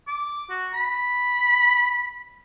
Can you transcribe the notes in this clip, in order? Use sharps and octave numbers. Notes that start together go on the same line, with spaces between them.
D6
F#4
B5